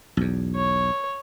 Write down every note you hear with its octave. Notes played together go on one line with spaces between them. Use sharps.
B1 E2
C#5